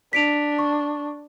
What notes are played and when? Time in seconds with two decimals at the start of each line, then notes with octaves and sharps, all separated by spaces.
0.13 D4 B6 D7 F7
0.59 C#6